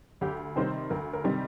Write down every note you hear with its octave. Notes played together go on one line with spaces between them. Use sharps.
D2 G4
C3 D#3 G3 C4 C5
D2 A#4
A#4
C3 D#3 G3 C4